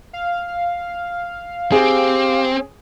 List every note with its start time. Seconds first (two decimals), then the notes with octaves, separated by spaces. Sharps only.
0.13 F5
1.72 C4 G4 G#4